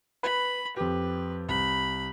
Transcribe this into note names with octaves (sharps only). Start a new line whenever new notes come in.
B4 B5
F2 G4 B4
C2 B5